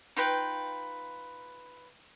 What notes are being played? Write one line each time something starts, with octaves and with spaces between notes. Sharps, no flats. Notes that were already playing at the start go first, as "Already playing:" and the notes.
D#4 F4 B4 G5